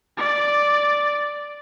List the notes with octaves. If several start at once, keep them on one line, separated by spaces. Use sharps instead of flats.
D5